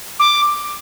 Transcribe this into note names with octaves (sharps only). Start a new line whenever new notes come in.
D6